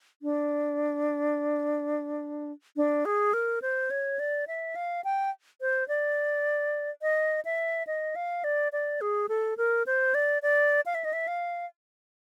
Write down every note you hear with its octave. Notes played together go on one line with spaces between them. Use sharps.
D4
D4
G#4
A#4
C5
C#5
D5
E5
F5
G5
C5
D5
D#5
E5
D#5
F5
D5
D5
G#4
A4
A#4
C5
D5
D5
F5
E5
D#5
E5
F5